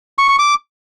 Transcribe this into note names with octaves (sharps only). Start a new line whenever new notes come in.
C#6
C#6
D6